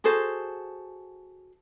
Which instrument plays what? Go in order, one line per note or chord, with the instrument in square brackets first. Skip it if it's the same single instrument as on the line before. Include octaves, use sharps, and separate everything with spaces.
[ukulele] F#4 G#4 A4 C5